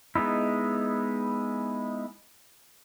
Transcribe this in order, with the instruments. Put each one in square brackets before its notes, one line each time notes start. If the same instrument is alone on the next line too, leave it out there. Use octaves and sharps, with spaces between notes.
[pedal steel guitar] G#3 B3 D#4 E4